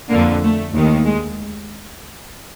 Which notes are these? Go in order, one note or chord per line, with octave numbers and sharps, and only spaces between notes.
F2 D3 A#3
A3
D#2 D#3
G#3